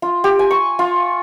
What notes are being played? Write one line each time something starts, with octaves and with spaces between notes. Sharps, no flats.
F4
G4
G#5
C#6
F4